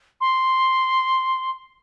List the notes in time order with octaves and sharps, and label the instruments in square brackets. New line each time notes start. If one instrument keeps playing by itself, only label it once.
[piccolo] C6